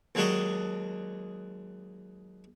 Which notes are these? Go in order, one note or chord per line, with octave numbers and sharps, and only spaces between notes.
D#2 F#3 G#3 D4 F#4 D#5